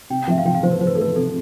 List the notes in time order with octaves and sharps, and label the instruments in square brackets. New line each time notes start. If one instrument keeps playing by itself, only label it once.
[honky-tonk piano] C3 [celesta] G5
[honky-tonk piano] F3 [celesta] E5
[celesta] F5
[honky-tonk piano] F3 [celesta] G5
[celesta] F5
[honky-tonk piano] F3 [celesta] C5
[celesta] B4
[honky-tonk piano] F3 [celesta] C5
[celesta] B4
A4
[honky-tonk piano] A3 [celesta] B4
[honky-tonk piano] C3 [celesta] A4